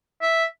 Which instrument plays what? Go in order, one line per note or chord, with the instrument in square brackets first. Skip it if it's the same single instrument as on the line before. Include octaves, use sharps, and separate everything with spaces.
[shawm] E5